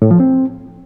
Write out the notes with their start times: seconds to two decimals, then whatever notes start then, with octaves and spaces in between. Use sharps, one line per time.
0.02 A2
0.11 F3
0.20 C4